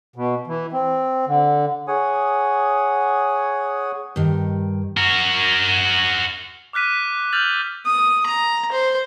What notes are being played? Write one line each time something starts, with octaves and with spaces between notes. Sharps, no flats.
B2
E3
C4
D3
G#4 C#5 F#5 G#5 D#6
G2 D#3
F#4 A#4
D6 F6 F#6 B6 D#7
E6 F6 G6 A6 F7 F#7
D#6
A#5
C5